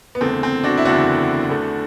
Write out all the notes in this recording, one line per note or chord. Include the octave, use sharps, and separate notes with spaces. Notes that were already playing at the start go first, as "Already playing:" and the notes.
B3
F#1 E2 D3 A3 C4
C4
D4 F#4
E4
F#1 E2 D3 A3 D4 F#4
E2 D3 A3